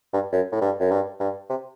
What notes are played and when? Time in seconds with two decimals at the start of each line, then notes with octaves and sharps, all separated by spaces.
0.13 G2
0.32 F#2
0.52 A2
0.61 G2
0.80 F#2
0.91 G2
1.20 G2
1.49 C3